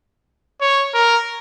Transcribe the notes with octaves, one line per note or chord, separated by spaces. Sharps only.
C#5
A#4